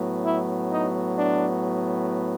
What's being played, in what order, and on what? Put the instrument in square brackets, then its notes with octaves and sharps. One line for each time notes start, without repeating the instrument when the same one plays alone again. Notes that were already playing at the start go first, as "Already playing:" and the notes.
Already playing: [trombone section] A2 F#3 B3
E4
D#4
D4